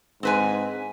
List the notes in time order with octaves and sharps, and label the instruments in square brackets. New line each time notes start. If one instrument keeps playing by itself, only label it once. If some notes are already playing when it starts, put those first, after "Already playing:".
[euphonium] G#2 [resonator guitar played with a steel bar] C4 B4 G#5